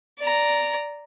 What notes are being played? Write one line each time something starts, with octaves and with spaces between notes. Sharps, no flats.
D5 A#5